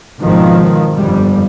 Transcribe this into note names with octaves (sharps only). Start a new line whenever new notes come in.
G#1 B2 D#3 F3
G1 F2 G3